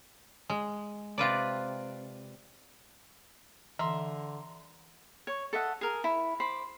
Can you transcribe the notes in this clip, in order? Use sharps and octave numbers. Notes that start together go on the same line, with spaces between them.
G#3
C3 F4 B4 D5
D3 E3 E5 A#5 C6
C#5
A4 D#5 E5 F#5
G#4 A#4
E4
C5 B5 D6